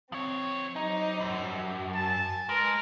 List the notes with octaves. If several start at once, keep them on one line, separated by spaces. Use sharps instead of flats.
F3 C4 C#5
F#3 G3 D#4 C5
C2 F#2
G#5 A5
G#3 A#4 B4